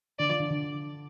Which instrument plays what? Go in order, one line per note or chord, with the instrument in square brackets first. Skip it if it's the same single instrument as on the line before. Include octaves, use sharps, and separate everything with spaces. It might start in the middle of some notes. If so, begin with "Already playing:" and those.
[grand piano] D3 [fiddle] D5
[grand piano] F3
D3
D3